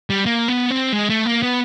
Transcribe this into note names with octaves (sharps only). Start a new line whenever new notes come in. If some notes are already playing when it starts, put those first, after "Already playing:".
G3
A#3
B3
C4
G#3
A3
A#3
B3